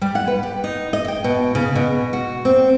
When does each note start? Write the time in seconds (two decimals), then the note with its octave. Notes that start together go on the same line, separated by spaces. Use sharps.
0.02 G3
0.15 F#5
0.27 B4
0.43 G4
0.64 D#4
0.93 D#5
1.08 G5
1.24 B2
1.55 C#3
1.75 B2
2.13 F#4
2.45 C4